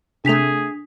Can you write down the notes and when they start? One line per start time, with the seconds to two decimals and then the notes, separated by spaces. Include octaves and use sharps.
0.25 C3 A3 D4 G#4 B6 F7